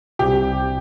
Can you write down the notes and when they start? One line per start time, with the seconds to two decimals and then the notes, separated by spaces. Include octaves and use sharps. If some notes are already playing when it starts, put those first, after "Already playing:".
0.19 C2 C3 G3 C4 G4